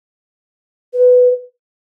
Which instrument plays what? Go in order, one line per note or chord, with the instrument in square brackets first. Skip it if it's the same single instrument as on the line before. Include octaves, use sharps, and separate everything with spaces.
[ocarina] B4